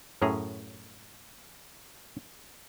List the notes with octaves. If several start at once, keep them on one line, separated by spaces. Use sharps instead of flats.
F#2 A2 C#4 G#4 A#5